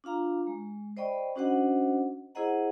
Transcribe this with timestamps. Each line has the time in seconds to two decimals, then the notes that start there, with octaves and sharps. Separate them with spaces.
0.04 D4 F4 F5 A#5
0.47 G#3
0.97 C5 D5 D#5 G5 B5 C#6
1.36 C#4 D4 F#4 C5 D#5 F#5
2.35 E4 G#4 C5 D#5 F#5 A#5